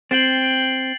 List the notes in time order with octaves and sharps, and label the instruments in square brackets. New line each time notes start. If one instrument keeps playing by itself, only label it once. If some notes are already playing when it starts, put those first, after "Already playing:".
[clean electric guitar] C4 [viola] G5 [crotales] A6 C7 F#7